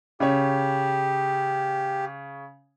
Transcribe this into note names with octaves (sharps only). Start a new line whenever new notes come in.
C#3 G4 C#5